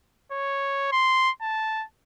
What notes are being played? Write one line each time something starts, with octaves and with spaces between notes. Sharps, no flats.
C#5
C6
A5